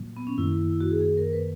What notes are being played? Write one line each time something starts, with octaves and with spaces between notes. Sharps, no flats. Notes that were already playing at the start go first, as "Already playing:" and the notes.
Already playing: A#2 F#3 A#3
B3
C#4
F#2 D#3 A#3 E4
E4
F#4
G#4
G#4
A#4
B4